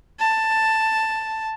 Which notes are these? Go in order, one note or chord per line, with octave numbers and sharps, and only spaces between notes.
A5